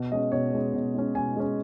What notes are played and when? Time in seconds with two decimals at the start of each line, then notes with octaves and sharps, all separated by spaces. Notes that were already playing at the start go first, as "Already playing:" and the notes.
Already playing: B2
0.12 G#3 C#4 D#5
0.32 B2 C#5
0.53 G#3 C#4
0.73 B2
0.95 G#3 C#4
1.15 B2 G#5
1.37 G#3 C#4